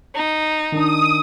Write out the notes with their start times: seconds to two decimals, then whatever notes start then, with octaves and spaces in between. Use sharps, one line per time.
0.15 D#4
0.72 D#3 D4 D#6